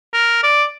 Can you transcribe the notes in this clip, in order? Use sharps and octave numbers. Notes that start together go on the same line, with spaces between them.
A#4
D5